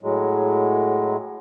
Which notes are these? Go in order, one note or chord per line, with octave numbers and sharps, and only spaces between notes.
A2 F#3 G#3